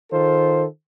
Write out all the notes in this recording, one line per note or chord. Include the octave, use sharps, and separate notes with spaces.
D#3 F4 A4 C5